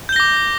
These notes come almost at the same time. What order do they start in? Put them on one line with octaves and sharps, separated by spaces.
G6 G7 A#6 D6